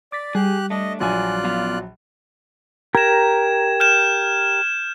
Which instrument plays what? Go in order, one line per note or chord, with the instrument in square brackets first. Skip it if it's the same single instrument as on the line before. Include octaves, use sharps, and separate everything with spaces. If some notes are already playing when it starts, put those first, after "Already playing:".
[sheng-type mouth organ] D5 [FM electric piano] D6 A6 B6
[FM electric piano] G3 [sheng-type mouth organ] G4 F#6 [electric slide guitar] G#4
[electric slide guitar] A3 D4 [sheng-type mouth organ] D#5
[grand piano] A#1 F#3 [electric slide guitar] G2 D4 G#5 [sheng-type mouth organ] F4 D5 F#6
[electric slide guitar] F#2 B3 F5
[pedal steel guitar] G4 A#4 A#5 [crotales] G#6 E7
[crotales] F6 G6 E7